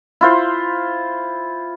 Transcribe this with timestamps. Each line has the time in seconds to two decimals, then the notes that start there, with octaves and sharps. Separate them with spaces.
0.21 E4 F4 C5